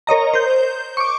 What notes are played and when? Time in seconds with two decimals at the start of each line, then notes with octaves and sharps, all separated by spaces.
0.07 A#4 C#5 D#5 A#5
0.34 C5 G6
0.97 C#6 D6